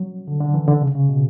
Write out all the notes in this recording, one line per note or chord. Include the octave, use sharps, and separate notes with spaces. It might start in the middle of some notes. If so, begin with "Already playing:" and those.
Already playing: F#3
D3
D3
E3
D3
C#3
C#3
B2